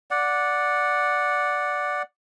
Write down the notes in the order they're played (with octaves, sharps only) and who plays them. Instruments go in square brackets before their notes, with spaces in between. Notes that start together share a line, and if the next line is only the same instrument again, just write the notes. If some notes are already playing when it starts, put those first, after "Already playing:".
[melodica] D5 F#5